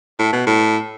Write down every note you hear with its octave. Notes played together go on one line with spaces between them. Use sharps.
A2
B2
A2